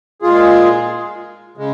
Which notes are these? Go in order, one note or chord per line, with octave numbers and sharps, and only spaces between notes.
A#2 G#3 F4 G#4
C#3 G#3